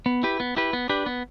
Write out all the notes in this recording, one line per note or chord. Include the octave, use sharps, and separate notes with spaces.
B3
E4 G4 B4
B3
E4 G4 B4
B3
D4 G4 B4
B3